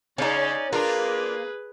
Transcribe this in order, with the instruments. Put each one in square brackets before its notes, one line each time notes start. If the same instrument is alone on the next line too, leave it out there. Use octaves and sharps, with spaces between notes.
[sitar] C#3 [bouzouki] C#4 D#4 [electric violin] D5
[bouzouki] A#3 [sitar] D4 F4 [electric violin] G#4 B4